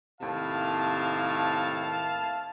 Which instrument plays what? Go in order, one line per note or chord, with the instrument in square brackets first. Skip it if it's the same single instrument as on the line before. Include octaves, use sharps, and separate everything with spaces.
[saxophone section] D#2 A2 C3 [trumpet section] E4 F5 A5